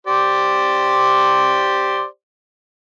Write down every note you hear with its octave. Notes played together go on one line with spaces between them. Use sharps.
G4 C5 D5